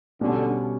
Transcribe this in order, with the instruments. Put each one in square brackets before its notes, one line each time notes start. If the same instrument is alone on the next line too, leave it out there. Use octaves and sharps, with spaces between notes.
[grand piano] B2 G3 C#4 [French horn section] D3